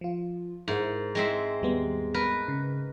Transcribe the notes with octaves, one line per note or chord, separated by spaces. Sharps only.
F3 F4
G#2 E4 A#4 C5
G#3 C4 E5
D#2 G3 B3
A#4 B4
C#3